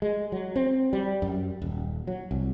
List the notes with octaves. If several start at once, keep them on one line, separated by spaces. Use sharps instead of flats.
G#3
F#3
C4
G3
F#2
D#1
F#3
C2